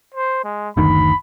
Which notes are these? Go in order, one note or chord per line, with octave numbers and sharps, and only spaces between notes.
C5
G#3
F#1 D2 D#3 B5